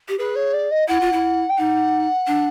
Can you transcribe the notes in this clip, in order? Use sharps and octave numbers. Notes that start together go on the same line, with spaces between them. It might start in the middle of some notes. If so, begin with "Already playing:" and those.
G4
G#4 B4
C#5
D5
D#5
E4 F#5
F4
E4
G5
D#4 F#5
D4